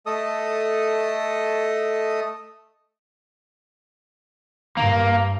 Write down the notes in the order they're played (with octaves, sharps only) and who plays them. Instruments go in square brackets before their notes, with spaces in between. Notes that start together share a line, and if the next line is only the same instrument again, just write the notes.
[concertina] A3 A4 D#5 D#6
[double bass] G2 [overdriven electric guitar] A#3